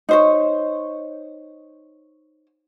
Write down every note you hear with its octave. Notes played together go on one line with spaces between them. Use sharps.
D#4 C5 C#5